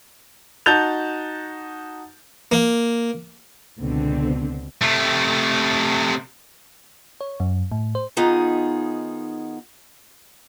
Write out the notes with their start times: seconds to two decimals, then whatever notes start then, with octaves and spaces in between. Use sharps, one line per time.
0.66 D#4 F#4 A5 G6 A6 F7
2.52 A#3
3.78 C#2 B2 D3 C4
4.82 C3 A3
7.21 C#5
7.40 F#2
7.72 A2
7.95 C5
8.17 D#3 B3 D#4 F4 G#4